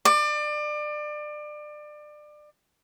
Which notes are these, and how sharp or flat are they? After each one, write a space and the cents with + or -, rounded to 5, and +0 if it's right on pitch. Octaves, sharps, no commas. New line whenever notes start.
D5 +30 D6 -25